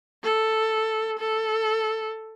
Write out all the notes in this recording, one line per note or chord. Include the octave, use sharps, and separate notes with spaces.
A4
A4